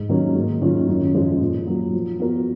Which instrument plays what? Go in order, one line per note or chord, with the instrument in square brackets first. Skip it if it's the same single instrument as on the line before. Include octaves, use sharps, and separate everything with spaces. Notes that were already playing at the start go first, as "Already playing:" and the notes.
Already playing: [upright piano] G#2
D#3 F#3 A#3 C#4
G#2
D#3 F#3 C#4 F4
F#2
F3 G#3 C#4 G#4
A#2
F#3 A#3
F3
B3 F#4 A#4